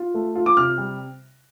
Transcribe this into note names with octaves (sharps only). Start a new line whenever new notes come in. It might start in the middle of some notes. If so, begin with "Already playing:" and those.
Already playing: F4
A3
F4
D6
C3 F6
G3